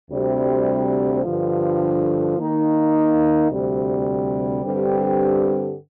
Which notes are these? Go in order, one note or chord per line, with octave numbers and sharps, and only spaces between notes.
D2 C3 G3
G2 D3 F3
D#3 A#3 D#4
D2 C3 G3
G2 D3 G3 C4 G4